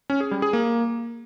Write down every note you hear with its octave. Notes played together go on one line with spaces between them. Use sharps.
C#4
G#4
G3
G#4
A#3